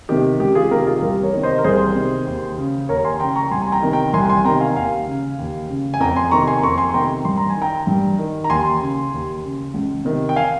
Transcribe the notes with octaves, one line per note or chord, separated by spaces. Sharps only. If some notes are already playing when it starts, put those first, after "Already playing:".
C3 D#3 G4
C#2 G4
F4 G#4
C3 D#3 G4 A#4
F4 G#4
C2 G4 A#4
A#4 C#5
C3 D#3
C5 D#5
A#4
C2 G#4 C5
C3 D#3
D#2
C#3
D#2 A#4 C#5
A#5
G#5 C6
C#3 G5 A#5
A#5 C#6
C2 G#5 C6
G#5
G5 A#5
C3 D#3
G5 A#5
C2 G#5 C6
G#5 C6
C3 D#3 G5 A#5
F5 G#5
D#2 F5 G#5
C#3
D#2
C#3
G#5
F2 G5 A#5
G#5 C6
C3 D#3 A#5 C#6
G#5 C6
F2 A#5 C#6
G#5 C6
C3 D#3 G5 A#5
G2 C6
A#5
G#5
D#3
G5 A#5
G2
D#3
A#5
D#2 G#5 C6
C#3
D#2
C#3
C#2
C3 D#3
G5
F5 G#5